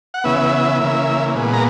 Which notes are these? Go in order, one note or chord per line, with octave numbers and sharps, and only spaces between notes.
F#5
C#3 E3 B3 E5
C#3 E3 A#3
A#2 G#3 B3
A#5